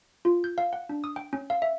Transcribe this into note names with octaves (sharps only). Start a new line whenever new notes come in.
F4
G6
F5
F#5
D4
D#6
G5
C#4
F5
E5